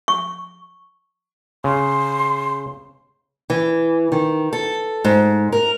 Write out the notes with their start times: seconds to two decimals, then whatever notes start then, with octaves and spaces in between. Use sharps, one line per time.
0.08 C#6
1.64 C#3 C6
3.50 E3
4.12 D#3
4.53 A4
5.04 G#2
5.52 A#4